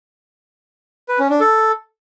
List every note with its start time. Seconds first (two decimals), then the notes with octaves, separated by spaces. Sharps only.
1.09 B4
1.19 C#4
1.30 D4
1.40 A4